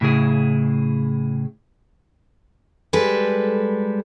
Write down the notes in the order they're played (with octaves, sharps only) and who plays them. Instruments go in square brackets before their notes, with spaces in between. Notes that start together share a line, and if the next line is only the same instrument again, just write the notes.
[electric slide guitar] A2 C#3 E4 G#4
[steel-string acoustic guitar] G3 G#3 A4 B4